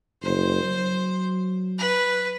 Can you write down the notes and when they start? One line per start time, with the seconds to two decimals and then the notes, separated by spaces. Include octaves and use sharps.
0.22 F#1 C5
0.63 F#3
1.78 B4